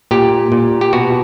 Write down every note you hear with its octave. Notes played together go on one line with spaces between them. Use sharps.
A#2 G4
A#2
G4
B2 F#4